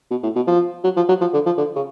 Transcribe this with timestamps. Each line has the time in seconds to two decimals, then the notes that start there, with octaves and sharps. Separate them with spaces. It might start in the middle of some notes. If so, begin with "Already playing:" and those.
0.11 B2
0.23 A2
0.36 B2
0.47 F3
0.84 F#3
0.96 F3
1.08 F#3
1.21 F3
1.33 D3
1.46 F3
1.57 D3
1.75 C#3